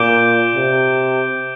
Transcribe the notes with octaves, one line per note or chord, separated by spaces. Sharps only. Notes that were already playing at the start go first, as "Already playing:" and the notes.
Already playing: A#2 D6 G6 D7 G7
C3